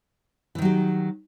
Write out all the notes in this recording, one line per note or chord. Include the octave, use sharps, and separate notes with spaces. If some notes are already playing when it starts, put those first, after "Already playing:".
D#3 E3 F#3 G4